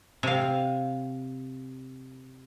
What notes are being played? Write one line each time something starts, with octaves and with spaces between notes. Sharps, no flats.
C3 F5